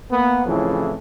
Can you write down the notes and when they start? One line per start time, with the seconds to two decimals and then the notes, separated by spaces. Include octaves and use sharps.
0.11 A#3 B3
0.46 F2 A2 C#3 E3 F3